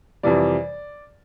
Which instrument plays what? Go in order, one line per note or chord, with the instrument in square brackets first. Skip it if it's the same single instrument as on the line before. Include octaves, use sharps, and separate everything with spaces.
[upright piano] F2 C3 E3 G3 D5